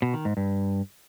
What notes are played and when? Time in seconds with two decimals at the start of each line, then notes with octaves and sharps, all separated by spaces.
0.02 B2
0.14 D#3
0.25 G#2
0.37 G2